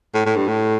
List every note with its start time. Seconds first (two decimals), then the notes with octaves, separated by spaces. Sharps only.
0.14 A2
0.26 A2
0.36 G2
0.48 A2